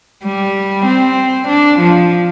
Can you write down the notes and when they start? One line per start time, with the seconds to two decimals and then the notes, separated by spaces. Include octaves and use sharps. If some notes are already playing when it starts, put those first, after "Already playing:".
0.24 G3
0.86 C4
1.49 D4
1.80 F3